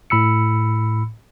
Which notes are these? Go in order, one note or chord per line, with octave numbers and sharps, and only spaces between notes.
A2 B5 E6 C#7